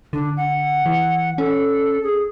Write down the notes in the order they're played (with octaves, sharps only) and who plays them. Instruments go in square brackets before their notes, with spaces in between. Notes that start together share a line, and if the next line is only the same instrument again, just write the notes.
[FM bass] D3 [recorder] D4
[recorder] F#5
[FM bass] E3
[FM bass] C#4 [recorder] A4
[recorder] G#4